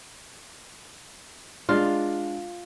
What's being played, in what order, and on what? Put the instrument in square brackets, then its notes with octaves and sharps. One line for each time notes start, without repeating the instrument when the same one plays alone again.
[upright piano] G#3 D4 [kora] F4